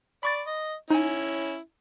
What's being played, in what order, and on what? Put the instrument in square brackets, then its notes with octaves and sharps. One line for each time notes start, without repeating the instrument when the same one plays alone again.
[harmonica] D5 [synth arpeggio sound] B5 C#6 A6
[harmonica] D#5
[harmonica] C#4 E4 [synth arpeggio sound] D#4 G#5